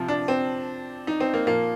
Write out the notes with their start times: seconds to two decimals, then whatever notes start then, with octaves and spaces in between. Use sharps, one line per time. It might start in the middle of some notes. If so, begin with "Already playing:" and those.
Already playing: C3 F3
0.08 D4
0.28 C4
1.07 D#4
1.20 C4
1.34 A#3
1.47 A#2 F3 A#3